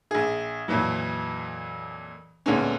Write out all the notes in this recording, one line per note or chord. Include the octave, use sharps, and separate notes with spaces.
A#1 G#4
F2 A#2 E3 F#3
D2 A#2 D3 G#3 B3 C#4